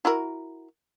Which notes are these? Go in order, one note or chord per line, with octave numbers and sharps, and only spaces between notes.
E4 F#4 A#4